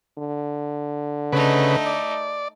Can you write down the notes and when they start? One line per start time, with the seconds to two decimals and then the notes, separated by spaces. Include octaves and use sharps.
0.18 D3
1.33 C#3 A3 D#4 B4
1.86 D5